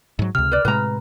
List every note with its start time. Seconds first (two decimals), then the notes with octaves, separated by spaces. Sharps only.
0.19 G#2 F#3
0.35 C#2 C3 F6
0.52 B4 D5
0.65 A2 C3 G#3 B4 A#5